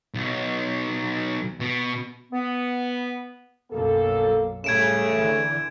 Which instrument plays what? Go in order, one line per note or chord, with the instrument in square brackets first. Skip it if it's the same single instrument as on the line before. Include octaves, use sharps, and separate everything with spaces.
[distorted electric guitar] B1
B2
[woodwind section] B3
[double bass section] B1 F#2 [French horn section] A#3 A4
[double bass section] A2 G3 [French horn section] C#3 A3 [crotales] G#6 D7 E7
[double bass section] D3 E3